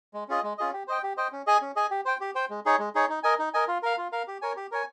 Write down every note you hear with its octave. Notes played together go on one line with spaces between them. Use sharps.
G#3
C#4 F4 G#4 D#5
G#3
C#4 F4 G#4 D#5
G4
C5 D#5 G5
G4
C5 D#5 G5
C#4
G#4 D#5 G#5
C#4
G#4 D#5 G#5
G4
C5 G5
G4
C5 G5
G#3
D#4 G#4 C#5
G#3
D#4 G#4 C#5
D#4
A#4 D#5 G#5
D#4
A#4 D#5 G#5
F4
A#4 F5
F4
A#4 F5
G4
A#4 C#5 G#5
G4
A#4 C#5 G#5